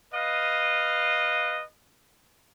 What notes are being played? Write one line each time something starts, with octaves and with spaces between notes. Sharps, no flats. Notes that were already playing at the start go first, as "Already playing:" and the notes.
B4 D#5 F5